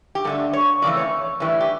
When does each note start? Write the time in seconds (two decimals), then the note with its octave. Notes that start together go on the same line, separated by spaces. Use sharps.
0.15 G4
0.25 G2 D3 A3 A4
0.53 C#5
0.82 F2 C#3 E3 A3 D5
0.97 C#5
1.40 A2 E3 G3
1.60 G4